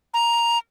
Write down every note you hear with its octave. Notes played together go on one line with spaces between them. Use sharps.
A#5